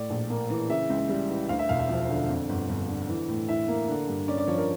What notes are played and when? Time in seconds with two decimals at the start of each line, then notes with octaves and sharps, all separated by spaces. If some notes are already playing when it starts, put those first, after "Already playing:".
Already playing: A2 D5
0.10 A#1
0.30 A#3
0.50 E3
0.70 C#3 E5
0.90 C#2
1.09 G3
1.30 E3
1.49 D2 F5
1.59 E5
1.69 E1 F5
1.79 E5
1.89 F3
2.09 D3
2.29 F2
2.49 G1
2.69 G1
2.88 D3
3.09 E3
3.29 A2
3.48 E4 E5
3.68 A#3
3.88 D3
4.08 G2
4.28 C#4 D5
4.38 D5
4.48 F3 C#5
4.58 A#4